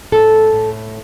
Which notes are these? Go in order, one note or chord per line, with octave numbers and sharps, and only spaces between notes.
A2 A4
A2